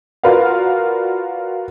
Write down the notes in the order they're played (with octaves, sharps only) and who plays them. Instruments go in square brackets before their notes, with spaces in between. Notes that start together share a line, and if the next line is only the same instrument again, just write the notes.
[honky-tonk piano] F4 F#4 A#4 B4 D5 F5